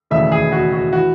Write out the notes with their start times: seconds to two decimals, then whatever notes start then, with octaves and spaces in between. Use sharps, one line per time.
0.10 E1 D#2 C#3 E3 A3 E5
0.32 G#4
0.52 F#4
0.72 F#4
0.93 E3 F#4